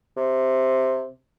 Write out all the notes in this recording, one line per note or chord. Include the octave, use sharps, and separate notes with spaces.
C3